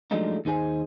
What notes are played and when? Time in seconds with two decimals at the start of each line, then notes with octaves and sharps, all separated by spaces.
0.11 F3 F#3 G#3 A3 D4 D#4
0.45 D#2 D#4 G#4 C5 G#5